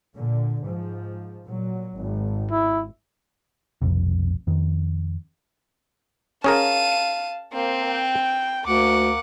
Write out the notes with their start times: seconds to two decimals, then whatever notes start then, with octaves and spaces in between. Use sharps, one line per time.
0.12 A#2 D3
0.60 G#2 F3
1.47 A#2 F#3
1.97 G#1
2.51 E4
3.82 F1 B1 F2 C3
4.47 F2 D#3
6.44 C#4 G#4 A#4 F5 A5 D#7
7.53 A#3 C4 C5
7.90 G5
8.68 D2 A#3 F#5 D6